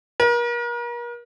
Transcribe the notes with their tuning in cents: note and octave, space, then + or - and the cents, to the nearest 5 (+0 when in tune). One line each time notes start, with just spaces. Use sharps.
A#4 +40